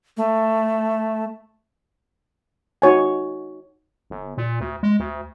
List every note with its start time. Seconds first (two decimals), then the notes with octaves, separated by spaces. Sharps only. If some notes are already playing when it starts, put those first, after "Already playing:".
0.17 A3
2.82 D#4 F#4 C#5 G#5
4.10 G1
4.37 A#2
4.60 D2
4.83 G#3
4.99 D2